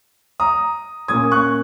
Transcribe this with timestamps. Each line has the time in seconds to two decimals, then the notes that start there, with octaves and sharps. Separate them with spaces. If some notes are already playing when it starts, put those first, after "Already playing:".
0.40 A#5 D#6
1.08 A#2 A#3 C#4 D#6 G#6
1.31 C#6 F#6